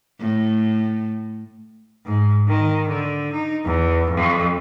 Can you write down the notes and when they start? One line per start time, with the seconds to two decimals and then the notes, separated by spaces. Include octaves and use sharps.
0.20 A2
2.05 G#2
2.48 D#3
2.89 D3
3.33 D#4
3.66 E2
4.11 F2